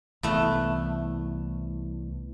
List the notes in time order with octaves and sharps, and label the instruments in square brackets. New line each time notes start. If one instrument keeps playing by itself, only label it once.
[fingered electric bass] C2 E3 [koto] A3 B3